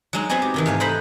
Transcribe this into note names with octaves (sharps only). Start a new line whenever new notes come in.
F#3 G#3 D#4
B3 C4 F#4 G#4 D#5 G#5
G4
C3 D#3 E3
G#2 A3 F5 G#5
D#4 B4 C5 D#5 F#5 B5